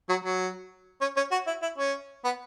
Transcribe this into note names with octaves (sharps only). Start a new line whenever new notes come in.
F#3
F#3
C#4
C#4
F#4
E4
E4
C#4
B3